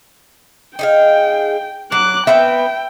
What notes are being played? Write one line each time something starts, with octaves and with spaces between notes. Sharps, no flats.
D#4 G#4 F5 G5
F#3 D6 F#6
B3 C4 B4 E5 G5